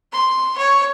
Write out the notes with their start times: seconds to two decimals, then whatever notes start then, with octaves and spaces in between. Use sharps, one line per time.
0.13 C6
0.57 C#5